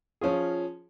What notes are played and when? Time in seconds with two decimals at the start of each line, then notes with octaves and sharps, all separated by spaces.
0.21 F3 C#4 F4 G#4